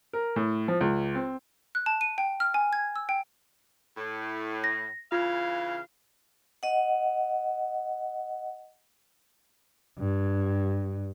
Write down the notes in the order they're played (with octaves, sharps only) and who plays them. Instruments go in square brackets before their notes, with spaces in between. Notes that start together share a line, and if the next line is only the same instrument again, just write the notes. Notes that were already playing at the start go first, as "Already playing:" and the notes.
[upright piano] A#4
A2
F3
C#2
C4
[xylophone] F#6
A5
D#7
G5
F6
G#5
G#6
E6
G5
[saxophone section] A2
[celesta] A#6
[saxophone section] C#3 E3 F5 [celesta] F4
[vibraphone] D#5 F#5
[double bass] G2